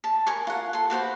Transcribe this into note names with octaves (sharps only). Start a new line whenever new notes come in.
A5
A#4 G#5 C#6
F4 F#5
A4 C6
F#4 B4 C5 C6